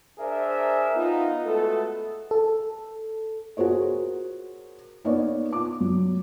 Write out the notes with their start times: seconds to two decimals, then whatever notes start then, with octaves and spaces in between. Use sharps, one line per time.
0.19 D4 G#4 A#4 C5 E5
0.95 B3 D#4 F4
1.45 G#3 A3 B3 F#4 A4
2.31 A4
3.57 F#4 G#4 A#4 C5 C#5
5.05 A#3 B3 D#4 C#5 D5
5.53 F4 D6
5.81 F#3